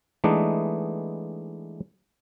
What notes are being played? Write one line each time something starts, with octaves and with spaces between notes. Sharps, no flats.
E3 G#3 A3 B3 D4 D#4